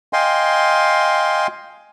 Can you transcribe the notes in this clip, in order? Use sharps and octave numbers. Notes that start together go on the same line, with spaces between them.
D#5 F5 G5 G#5 C6